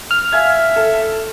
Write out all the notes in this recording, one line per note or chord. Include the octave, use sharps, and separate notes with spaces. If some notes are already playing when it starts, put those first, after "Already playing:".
F6
E5 F5 G#5 G#6
A4